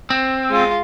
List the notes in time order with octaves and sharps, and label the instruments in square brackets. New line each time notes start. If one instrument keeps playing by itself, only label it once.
[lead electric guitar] C4
[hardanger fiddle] G#3 F4